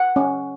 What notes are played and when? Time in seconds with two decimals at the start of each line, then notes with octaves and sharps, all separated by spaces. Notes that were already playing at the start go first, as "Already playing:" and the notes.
Already playing: F#5
0.16 C#4